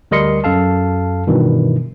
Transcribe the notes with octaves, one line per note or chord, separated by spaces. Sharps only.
D2 G3 A#4 D#5 C6 C#7
F#2 A4 F5 A5
G2 B2 D#3 E3